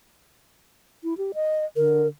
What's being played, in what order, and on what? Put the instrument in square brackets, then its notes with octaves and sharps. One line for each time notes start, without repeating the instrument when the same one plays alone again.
[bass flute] E4
G4
D#5
[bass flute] D3 [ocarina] A#4